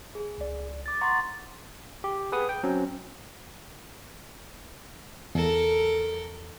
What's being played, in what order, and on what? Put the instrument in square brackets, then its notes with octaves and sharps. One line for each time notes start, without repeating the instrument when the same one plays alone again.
[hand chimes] G#4
[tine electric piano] C#2 D5
[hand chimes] D6 A6
[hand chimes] F#5 C6 A6 [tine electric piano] A#5 C#6
[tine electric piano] G4
G#4 B4 F#5 D#6
G5
F#3 C4 C#4
[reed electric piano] E2 [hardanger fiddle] A4 A#4